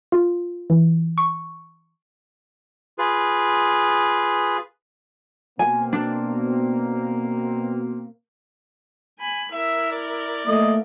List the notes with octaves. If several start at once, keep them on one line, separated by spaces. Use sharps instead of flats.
F4
E3
C#6
F4 G#4 B4
B2 A#3 C4 G#5
D4
G#5 B5
E4 A#4 E5
D5
A3 A#3 D#5